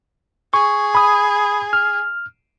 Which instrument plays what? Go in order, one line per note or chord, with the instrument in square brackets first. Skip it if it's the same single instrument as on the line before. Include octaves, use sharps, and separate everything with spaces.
[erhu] G#4 [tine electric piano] C#6
[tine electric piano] B5 D#6
F6